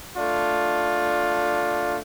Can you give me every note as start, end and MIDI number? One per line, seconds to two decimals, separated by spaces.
0.16 1.98 57
0.16 1.98 62
0.16 1.98 65